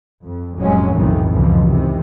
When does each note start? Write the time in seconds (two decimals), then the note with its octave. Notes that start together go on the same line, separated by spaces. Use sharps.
0.24 F2
0.59 F1 A2 F#3 G#3 C#4
0.94 B1 F2 A2 C3 D#3 E3
1.31 C#2 F#2 B2 E3 F3
1.68 C3 D#3 E3